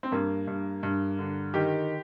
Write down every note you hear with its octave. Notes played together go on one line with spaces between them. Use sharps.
C4
G2 A#3
G2
G2
D3
D#3 G4